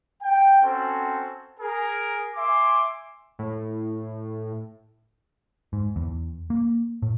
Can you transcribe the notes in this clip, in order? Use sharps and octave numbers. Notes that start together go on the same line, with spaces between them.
G5
C4 C#4 F#4 A4 C5
G#4 A#4
E5 G#5 C6 D6
A2
G#2
E2
A#3
A2